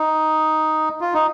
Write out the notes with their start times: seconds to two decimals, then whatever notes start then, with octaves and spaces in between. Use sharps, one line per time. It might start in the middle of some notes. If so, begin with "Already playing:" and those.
Already playing: D#4
1.01 F4
1.14 D#4